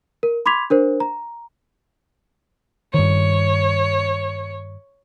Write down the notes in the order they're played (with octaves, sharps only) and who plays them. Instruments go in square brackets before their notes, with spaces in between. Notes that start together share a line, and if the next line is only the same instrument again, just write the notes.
[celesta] A#4
B5 C6 D6 G#6 B6 F7
D4 A#4 C5
A#5
[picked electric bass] G2 D#3 [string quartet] C#5